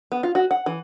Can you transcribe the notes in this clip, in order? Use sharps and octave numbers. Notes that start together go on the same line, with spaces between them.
B3
F4
F#4
F#5
E3